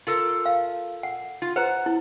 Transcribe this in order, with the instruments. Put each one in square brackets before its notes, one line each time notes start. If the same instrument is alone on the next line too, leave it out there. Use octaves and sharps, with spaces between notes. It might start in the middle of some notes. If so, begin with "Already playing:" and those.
[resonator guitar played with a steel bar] F4 A4 A#4
[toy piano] F5
F#5
[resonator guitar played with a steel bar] F4
[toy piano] B4 C5 A#5 [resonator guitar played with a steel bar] F#5
[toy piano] E4